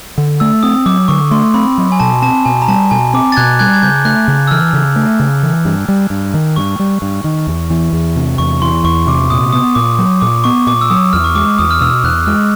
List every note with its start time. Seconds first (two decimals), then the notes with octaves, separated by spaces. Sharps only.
0.18 D3
0.40 A3 E6
0.63 C4 D#6
0.86 F#3 D6
1.08 D3 C#6
1.31 A3 C6
1.54 C4 B5
1.78 F#3
1.92 G#5
2.00 B2 A5
2.22 C4 A5
2.45 B2 G#5
2.62 A#5
2.68 G3 A5
2.91 B2 G#5
3.13 C4 D6
3.32 A6
3.36 B2 F#6 G#6
3.59 G3 F#6 G#6
3.73 G#6
3.83 C#3 G6
4.05 A3 F#6
4.28 C#3
4.47 E6
4.51 E3 F6
4.73 C#3
4.96 A3
5.20 C#3
5.43 E3
5.65 G2
5.88 G3
6.10 G2
6.34 D#3
6.56 G2 C#6
6.79 G3
7.02 G2
7.24 D#3
7.47 E2
7.70 E3
7.93 E2
8.16 C3
8.38 E2 C#6
8.62 E3 C6
8.84 E2 C#6
9.07 C3 D6
9.30 A#2 D#6
9.53 B3 D#6
9.75 A#2 D6
9.98 F#3
10.21 A#2 D6
10.44 B3 C#6
10.67 A#2 D6
10.81 E6
10.90 F#3 D#6
11.13 E2 F6
11.24 C#6
11.35 G#3 D6
11.58 E2 D#6
11.71 F6
11.81 B2 E6
12.03 E2 F#6
12.26 G#3 F6